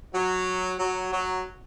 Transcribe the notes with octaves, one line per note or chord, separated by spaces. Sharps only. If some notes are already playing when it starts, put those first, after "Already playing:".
F#3
F#3
F#3